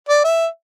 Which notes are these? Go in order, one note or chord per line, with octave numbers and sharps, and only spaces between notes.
D5
E5